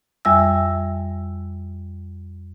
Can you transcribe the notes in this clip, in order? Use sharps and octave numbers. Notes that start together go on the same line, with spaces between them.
F2 G3 E5 G#5 E6